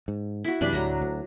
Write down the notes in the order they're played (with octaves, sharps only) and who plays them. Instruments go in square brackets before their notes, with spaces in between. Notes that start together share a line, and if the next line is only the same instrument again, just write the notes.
[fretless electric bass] G#2
[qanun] E4 F#4
[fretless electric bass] F#2 C3 E3 [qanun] G3 D4 D5
[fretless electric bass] D2 A2 [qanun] F#3 A#5
[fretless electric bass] D2